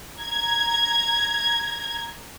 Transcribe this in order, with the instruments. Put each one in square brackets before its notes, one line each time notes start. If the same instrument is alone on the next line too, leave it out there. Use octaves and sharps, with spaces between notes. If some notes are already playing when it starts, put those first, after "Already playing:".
[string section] A#5 G#6